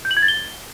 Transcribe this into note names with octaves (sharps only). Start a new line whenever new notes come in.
G6
F#7
G#6
A6
G7